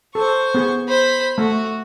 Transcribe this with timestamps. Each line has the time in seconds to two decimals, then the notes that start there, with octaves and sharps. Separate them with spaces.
0.15 A4 C5 C#6
0.54 B3 G#4
0.88 C5 B5
1.38 A3 F#4